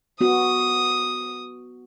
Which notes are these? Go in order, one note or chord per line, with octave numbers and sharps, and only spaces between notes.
B3 F#4 D#6